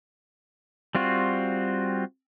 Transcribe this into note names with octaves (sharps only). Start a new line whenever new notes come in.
G3 C4 F4 F#4